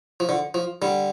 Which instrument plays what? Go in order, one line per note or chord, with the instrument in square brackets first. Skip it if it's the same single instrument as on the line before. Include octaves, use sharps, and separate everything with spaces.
[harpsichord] F3
D3
F3
D3 G3